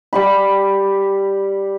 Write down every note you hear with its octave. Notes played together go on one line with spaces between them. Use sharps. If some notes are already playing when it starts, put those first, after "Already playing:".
G3 G4 B5